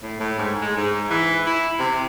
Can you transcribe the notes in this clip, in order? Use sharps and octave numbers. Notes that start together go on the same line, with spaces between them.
A2
A2
G#2
G#3
G#2
E3
E4
C3